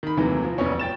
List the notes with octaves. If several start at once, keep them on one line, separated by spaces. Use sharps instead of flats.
D#3 B5
D#2 C3 E3 F#3 A3
F3
E1 A#1 E2 B3 C#4 C#5
G5 A6 E7